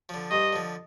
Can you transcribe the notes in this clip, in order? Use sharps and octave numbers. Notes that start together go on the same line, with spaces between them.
D3 F3
G2 D#5
D3 F3